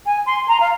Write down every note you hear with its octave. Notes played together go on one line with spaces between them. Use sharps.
G#5
C6
A#5
F5